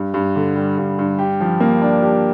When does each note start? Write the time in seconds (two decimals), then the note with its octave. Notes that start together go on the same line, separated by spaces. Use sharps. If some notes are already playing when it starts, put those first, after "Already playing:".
Already playing: G2
0.14 G2
0.36 D3
0.56 G3
0.78 G2
0.99 G2
1.19 G4
1.41 F3
1.60 A#3
1.82 D4
2.03 G4